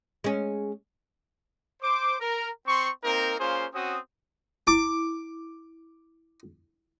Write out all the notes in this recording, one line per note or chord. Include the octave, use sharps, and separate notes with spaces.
G#3 C#4
C5 D6
A#4
C4 C6 C#6
A#3 C4 D#4 A#4
A#3 C#4 F4 G#4 C5
C4 C#4 F#4 D#6
E4 D6